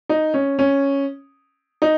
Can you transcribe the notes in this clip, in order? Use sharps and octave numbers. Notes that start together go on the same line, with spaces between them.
D#4
C#4
C#4
D#4